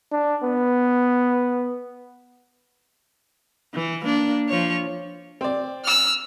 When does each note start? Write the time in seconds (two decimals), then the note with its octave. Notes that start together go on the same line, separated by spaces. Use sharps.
0.12 D4
0.43 B3
3.74 E3
4.05 A#3 D4
4.49 F3 C#5
5.41 C4 D5
5.85 E6 F6